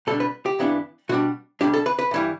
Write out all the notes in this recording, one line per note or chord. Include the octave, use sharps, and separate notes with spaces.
B2 G3 D4 A4
B4
G4
G2 E3 B3 D4
B2 G3 D4 F#4
B1 A2 G3 D4 G4
A4
B4
B4
G2 E3 G3